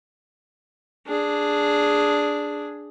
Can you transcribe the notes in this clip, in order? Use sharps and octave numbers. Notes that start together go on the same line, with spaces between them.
D4 G#4